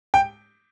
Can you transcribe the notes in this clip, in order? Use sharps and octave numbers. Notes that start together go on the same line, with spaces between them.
G5